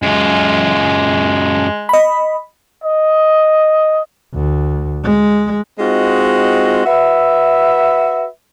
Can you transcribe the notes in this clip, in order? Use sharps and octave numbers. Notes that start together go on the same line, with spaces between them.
F#2 G#3 F4
D#5 B5
D#5
D2
G#3
G#3 C4 D#4 F4 F#4
F#4 B4 E5